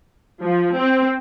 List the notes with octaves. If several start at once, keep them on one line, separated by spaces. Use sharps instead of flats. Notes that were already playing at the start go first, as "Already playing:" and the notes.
F3
C4